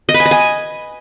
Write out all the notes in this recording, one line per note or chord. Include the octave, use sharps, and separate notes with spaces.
D#5
B4
G#5
D#5
G#5